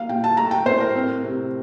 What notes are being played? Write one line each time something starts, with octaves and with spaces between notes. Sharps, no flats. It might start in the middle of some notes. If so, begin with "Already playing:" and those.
Already playing: A#3 F5
A#2 G5
A5
A3 A#5
G5
A2 C5
A#4
C4
C3